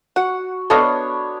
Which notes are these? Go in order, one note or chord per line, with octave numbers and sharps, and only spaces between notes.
F#4 F#5
B3 D4 A4 C#5 D#5 F5